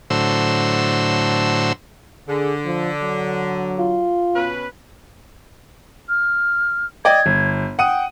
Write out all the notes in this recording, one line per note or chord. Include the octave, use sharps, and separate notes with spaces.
A2 D3 F#3 C5 E6
D3 G#4
F3
F#3
F4
B2 C#4 B4
F6
D5 D#5 G5 G#6
G1
F#5 G5 D#6 D#7